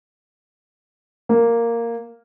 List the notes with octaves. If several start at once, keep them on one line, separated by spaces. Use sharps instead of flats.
A#3